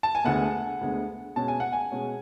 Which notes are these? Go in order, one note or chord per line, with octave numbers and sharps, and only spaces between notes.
A5
G#5
D2 D3 G#3 B3 F#5
D2 D3 G#3 B3
B2 G#3 C#4 A5
G#5
F#5
G#5
B2 G#3 C#4